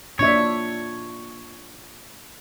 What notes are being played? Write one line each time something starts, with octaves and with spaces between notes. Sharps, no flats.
A#2 D4 C#5 E5